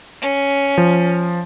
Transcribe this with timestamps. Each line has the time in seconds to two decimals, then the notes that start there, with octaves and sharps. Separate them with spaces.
0.21 C#4
0.78 F3